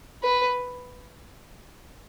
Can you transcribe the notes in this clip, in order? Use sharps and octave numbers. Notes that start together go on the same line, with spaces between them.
B4